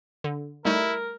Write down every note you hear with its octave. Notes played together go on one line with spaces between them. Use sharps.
D3
G3 A3 D#4 E4 A#4